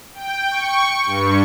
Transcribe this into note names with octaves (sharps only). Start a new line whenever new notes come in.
G5
C#6
G2